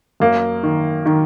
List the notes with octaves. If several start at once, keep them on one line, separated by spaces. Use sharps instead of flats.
F#2 A#3
D#3
D#3